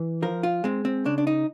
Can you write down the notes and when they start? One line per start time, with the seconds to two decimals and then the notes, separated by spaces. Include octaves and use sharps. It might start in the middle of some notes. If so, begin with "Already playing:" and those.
Already playing: E3
0.22 F3 A#4
0.43 F4
0.64 G#3 C4
0.85 C4
1.05 C#3 D4
1.18 D4
1.27 D#4